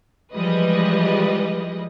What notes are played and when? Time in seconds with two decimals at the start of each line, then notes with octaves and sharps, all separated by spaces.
0.34 E3 F3 G3 G#3 B4 D#5